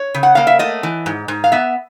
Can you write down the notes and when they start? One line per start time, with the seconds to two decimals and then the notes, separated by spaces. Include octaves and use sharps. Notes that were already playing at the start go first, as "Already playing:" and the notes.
Already playing: C#5
0.14 C#3
0.23 F#5
0.35 A#3 F5
0.47 E5
0.59 A3 D#5
0.83 E3
1.06 G#2
1.28 G#2
1.44 F5
1.52 B3 E5